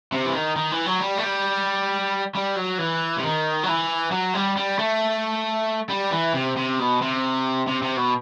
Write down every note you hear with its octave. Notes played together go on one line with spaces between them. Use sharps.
C3
E3
D#3
D#3
E3
F#3
G3
A3
G3
G3
F#3
E3
C3
D#3
F#3
E3
F#3
G3
G3
A3
G3
E3
C3
C3
B2
C3
C3
C3
B2